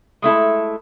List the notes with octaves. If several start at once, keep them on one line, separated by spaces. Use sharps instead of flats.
G#3 A3 E4 A4